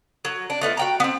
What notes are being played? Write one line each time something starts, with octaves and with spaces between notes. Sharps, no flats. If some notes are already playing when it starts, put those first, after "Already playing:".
F#3
D4
A3 B3 D#4 F4
F#4 G5 A#5
B3 C4